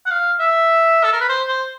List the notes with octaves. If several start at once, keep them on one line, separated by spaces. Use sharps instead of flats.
F#5
F5
E5
A4
A#4
B4
C5
C5